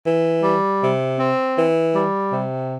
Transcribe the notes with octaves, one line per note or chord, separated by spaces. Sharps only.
E3
G3
C3
C4
E3
G3
C3